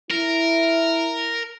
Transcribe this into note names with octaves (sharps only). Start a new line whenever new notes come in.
E4 A#4